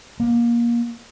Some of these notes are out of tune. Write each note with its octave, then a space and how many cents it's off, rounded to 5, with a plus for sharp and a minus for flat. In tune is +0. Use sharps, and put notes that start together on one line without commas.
A#3 +20